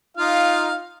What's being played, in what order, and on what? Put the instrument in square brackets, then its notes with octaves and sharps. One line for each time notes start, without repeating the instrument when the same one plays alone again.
[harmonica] D#4 F4 F5